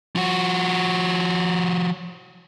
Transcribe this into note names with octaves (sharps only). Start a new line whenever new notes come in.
F3 F#4